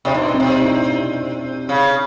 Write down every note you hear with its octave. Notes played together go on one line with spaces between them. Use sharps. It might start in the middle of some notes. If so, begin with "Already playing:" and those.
C3 D4
B2 D#4
C4
C3 C#4
D4
D#4
E4
C#3